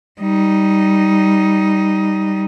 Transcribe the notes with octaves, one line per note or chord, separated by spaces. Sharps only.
G3 D#4